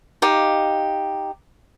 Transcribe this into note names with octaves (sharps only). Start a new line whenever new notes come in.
D#4 G4 F5